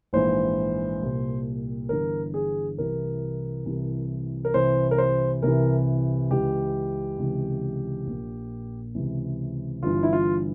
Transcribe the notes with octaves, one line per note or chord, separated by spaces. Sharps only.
A#1 G#2 E3 C5
C2 A#2
G1 G2 E3 A#4
G#4
C2 C3 E3 A#4
C2 C3 E3
A#4
C2 C3 E3 C5
A#4
C5
C2 C3 E3 A#4
C#2 C#3 E3 G4
C#2 C3 E3
A#1 A#2
C#2 C3 E3
G1 G2 E3 F4
E4
F4